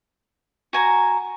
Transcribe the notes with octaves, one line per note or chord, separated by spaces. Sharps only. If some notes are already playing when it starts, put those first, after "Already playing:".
F#4 G#5 A#5